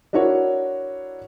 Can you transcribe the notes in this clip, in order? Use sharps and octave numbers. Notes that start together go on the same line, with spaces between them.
D4 E4 F#4 A#4 C#5